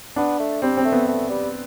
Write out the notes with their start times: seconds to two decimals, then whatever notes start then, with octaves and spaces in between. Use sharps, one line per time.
0.16 B3 D4
0.40 A3
0.62 G3 C4
0.77 C4
0.85 A3
0.92 B3
1.08 A3
1.30 G3